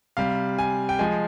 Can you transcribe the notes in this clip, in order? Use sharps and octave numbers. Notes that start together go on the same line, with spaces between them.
C3 G3 F5
G#5
G5
F3 G#3 G#5